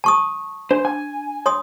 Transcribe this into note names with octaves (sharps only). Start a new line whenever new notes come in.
A5 C#6 D#6
D4 C5
G#5
C#5 C6 D#6